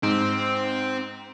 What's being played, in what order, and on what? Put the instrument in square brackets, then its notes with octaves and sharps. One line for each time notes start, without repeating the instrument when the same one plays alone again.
[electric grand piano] G#2 D#4 [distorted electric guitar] C4